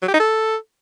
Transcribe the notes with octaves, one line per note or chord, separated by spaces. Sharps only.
F#3
G4
D#4
A4